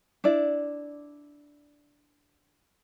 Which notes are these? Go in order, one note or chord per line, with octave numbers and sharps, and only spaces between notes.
D4 E4 D5